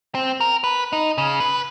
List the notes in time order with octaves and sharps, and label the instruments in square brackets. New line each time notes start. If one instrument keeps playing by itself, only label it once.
[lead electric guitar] C4
A#4
B4
D#4
C#3
B4